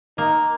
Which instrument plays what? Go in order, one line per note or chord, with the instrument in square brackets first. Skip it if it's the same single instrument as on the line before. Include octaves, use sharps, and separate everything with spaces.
[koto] A#3 [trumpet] D#4